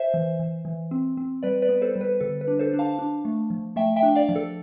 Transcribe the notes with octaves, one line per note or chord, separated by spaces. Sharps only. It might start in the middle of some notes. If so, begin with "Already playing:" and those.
Already playing: C5 E5
E3
E3
E3
C4
C4
G3 B4 D5
B4 D5
B3
A4 C5
G3
B4
D3 A4
B4
D4
A4 C5
D4
F5 A5
D4
A3
F3
A3 E5 G5
E5 G5
D4
D5 F5
F3
A4